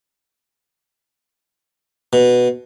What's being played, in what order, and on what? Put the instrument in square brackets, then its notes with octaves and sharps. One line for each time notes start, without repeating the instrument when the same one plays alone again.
[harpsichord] B2